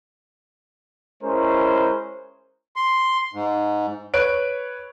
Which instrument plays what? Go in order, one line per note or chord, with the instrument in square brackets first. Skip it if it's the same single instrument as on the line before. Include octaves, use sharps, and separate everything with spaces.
[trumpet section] G#3 C#4 E4 A#4 C5
[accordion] C6
G#2
[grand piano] B4 C#5 F#6 D7